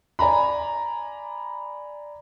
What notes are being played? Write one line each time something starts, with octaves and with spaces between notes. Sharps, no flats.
D5 G#5 A#5 B5